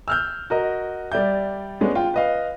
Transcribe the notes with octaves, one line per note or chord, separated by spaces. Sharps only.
E6 F6 G6
F#4 A#4 D#5
G3 D5 E5 G6
G#3 B3 C#4 D4
F4 G5
B4 D#5 F5